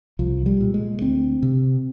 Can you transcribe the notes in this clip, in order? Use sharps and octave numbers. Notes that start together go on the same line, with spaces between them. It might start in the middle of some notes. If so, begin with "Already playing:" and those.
C2 F3
G3
A#2
G#3
D2 C4
C3